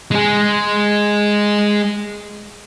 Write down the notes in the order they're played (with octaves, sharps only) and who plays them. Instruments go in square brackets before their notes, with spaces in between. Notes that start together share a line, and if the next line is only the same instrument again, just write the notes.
[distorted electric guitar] G#3 G#4